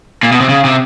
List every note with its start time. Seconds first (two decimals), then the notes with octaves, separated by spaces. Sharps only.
0.23 A#2
0.32 B2
0.40 C3
0.49 C#3
0.64 C3